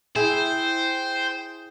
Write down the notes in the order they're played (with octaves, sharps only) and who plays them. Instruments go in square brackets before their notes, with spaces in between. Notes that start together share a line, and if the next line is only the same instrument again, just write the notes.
[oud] E4 [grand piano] G#4 [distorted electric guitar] C5 [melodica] G5